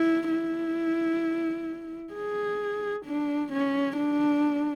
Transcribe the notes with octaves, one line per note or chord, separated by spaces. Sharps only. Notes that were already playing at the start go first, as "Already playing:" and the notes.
Already playing: E4
E4
G#4
D4
C#4
D4